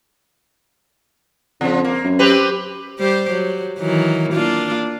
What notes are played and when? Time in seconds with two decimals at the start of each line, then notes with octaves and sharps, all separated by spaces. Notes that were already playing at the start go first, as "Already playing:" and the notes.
1.61 F2 C#3 F3
1.84 A#3
2.04 F#2
2.19 C4 G4 B4
2.99 G3 G4 C5
3.30 F#3
3.79 D#3 E3 F#3
4.33 A#3 D4 F4